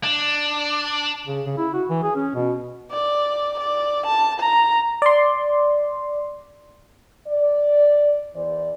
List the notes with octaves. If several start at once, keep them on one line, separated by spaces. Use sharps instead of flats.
D4
C#3
C#3
E4
F#4
E3
G#4
C#4
B2
D5
D5
A5
A#5
D5 C6
D5
E2 E3 C5 D5